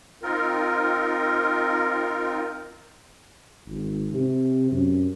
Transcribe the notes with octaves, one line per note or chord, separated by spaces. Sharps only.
C4 D#4 F4 A#4
G#1
C3
F#2